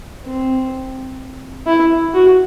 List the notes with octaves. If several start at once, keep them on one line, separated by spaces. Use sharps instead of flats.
C4
E4
F#4